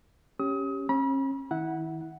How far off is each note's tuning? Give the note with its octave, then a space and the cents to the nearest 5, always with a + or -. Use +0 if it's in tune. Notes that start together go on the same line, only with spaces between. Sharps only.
C#4 -5 G4 +0 D#6 +30
C#4 -40 B5 -40
D#3 +30 E4 -20 F#5 +0